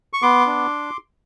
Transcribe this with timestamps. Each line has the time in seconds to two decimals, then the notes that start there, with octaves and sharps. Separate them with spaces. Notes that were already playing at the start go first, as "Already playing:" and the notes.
0.13 C#6
0.22 B3 C6 D6
0.47 D4